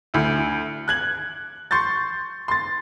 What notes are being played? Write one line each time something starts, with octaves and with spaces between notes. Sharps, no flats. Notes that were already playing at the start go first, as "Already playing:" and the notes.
D2 E4
F#6 G#6 F#7
C6 C#6 G6 A6
C6 A6